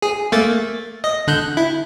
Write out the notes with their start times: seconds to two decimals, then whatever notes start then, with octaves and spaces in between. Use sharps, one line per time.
0.02 G#4
0.32 A3 A#3 A6
1.04 D#5
1.27 D3 F#6 G6
1.57 E4